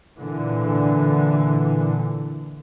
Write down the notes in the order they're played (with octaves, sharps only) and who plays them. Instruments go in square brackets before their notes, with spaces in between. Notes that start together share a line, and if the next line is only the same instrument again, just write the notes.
[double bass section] A#2 D3 E3